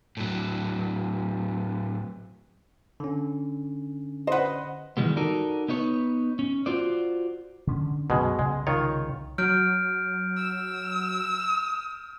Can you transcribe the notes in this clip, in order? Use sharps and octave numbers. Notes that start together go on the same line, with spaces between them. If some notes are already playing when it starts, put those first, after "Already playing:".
A2 F#3
D3 C#4
B4 C5 D#5 F#5
D#3 E3 G3 G#3 B3
D#4 F#4 A4 A#4 D5
B3 D#4 B4 C#5
C#4
F4 F#4 C5 D5
D3 C#4
C2 F#2 B2 G#3
C2 C#3 G#3
D#3 F4 C#5
F#3 F6 G6 D7
E6